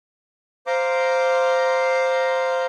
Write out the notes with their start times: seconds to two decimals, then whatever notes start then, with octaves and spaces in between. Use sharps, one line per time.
0.67 C5 F5 A#5 C6 D6